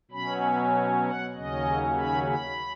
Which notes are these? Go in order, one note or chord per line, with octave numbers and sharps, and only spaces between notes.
B2 F#3 C#4 B5
F#5
D#2 C#3 F#3 C#4 D#5
B5
B5